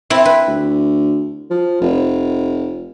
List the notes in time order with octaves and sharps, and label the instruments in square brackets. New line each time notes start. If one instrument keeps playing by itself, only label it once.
[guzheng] C4 E4
B4
[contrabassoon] D2
F3
F1